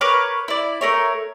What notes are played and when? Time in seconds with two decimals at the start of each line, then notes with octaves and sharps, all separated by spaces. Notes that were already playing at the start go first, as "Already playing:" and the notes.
0.01 A#4 B4 C#5 D6
0.48 E4 D5
0.81 A3 A#4 C#5